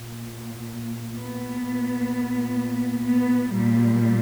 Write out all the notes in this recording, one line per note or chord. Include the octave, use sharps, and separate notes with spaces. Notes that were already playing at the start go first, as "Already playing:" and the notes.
Already playing: A#2
B3
A#2
B3
A#2 G3